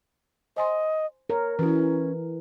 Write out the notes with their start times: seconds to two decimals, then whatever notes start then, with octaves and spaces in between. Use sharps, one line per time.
0.57 C5 D#5 G#5 C6
1.30 A#4 C#5
1.59 E3 C#4 E4 F#4 B4